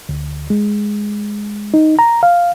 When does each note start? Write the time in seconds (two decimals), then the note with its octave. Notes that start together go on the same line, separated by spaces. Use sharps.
0.09 D2
0.50 G#3
1.74 D#4
1.99 A#5
2.23 F5